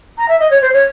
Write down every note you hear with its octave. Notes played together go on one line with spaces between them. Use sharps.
A#5
E5
D#5
C#5
C5
C#5